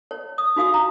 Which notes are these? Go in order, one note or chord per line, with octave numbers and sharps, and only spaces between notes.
C#5
D#6
D#4 F#4 F5 D#6
A#5